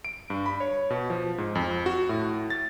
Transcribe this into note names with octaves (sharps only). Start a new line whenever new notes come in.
D7
G2
B5
C#5
B2
F3
G#2
F2
F#4
A2
A6